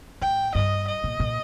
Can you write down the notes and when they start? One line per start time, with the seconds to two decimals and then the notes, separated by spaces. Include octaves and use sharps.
0.21 A2 G5
0.55 G2 D#5
0.87 D#5
1.04 A#2
1.20 A#2